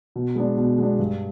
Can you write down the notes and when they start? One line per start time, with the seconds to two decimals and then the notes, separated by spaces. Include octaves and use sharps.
0.16 B2
0.35 G#3 B3 D4
0.57 B2
0.78 G#3 B3 D4
0.99 G2